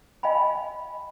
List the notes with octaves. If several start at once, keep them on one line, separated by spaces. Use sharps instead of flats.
D#5 F5 G5 G#5 B5